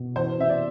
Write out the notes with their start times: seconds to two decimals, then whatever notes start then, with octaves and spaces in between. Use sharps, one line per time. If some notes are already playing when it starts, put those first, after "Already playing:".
Already playing: B2
0.16 E3 C5
0.38 C3 E5
0.49 D5